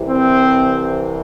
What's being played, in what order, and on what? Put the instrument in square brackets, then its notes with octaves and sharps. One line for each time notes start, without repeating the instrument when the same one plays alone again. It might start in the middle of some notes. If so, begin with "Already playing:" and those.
Already playing: [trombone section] C2 C3 E3
C4